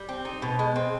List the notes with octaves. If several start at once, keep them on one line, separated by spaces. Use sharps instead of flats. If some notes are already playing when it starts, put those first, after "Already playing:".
Already playing: G3
C4
D#4
B2
G#3
C4